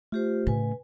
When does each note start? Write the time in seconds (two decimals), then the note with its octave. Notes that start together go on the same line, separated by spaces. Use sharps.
0.12 A3 F4 G4 C5
0.47 A2 C#3 B4 G#5